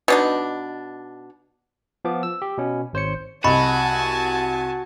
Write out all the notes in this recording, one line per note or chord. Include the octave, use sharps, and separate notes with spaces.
B2 D4 D#4
F3 B3 D6
E6
G4
B2 B3 C#4
G#1 C5 C#5 C#7
C2 F#4 D#5 G#5 A5 B5 C#6